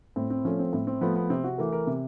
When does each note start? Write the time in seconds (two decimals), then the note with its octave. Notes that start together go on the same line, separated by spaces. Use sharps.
0.16 A2 C4
0.30 C4
0.45 F3 A3 C#4
0.59 C4
0.73 A2 C4
0.87 C4
1.01 F3 A3 B3
1.16 B3
1.30 C3 C4
1.44 F#4
1.58 E3 A3 A#4
1.73 A#4
1.87 C3